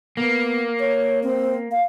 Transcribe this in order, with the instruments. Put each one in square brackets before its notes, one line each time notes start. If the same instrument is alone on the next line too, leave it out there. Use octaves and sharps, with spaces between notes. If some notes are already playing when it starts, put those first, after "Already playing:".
[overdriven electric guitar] A#3 [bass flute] B3
[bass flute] C#5
C4
F5